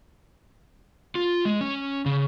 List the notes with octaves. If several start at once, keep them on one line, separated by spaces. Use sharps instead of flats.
F4
G#3
C#4
C#3